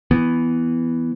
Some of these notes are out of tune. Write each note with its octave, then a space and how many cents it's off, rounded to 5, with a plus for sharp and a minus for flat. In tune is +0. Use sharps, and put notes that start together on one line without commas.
E3 +0 B3 +0